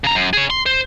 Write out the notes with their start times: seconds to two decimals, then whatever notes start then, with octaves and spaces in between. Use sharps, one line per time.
0.04 C#3 A#5
0.15 F#2
0.33 G#4 C#5
0.50 C6
0.66 C5